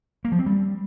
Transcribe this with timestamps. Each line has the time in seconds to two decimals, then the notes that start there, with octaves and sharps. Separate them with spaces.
0.25 A#3
0.32 F3
0.39 C4
0.46 G3